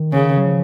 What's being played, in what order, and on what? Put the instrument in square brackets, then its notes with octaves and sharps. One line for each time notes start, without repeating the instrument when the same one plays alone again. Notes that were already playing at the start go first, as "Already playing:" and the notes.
Already playing: [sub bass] D#3
[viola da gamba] C#3
[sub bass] F#3
F3